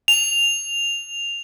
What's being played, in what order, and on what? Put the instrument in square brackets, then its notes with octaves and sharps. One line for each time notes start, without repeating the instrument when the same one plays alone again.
[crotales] F7